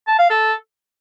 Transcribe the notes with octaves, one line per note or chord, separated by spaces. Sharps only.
A5
F5
A4